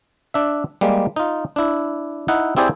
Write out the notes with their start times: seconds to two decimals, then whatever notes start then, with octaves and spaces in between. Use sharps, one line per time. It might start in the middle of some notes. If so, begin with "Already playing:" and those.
0.34 D4 E5
0.81 G3 G#3 A#3
1.16 D#4 F4
1.56 D4 E4
2.28 D#4 E4 F#5
2.57 C4 E4 G4 G#4 C5 D5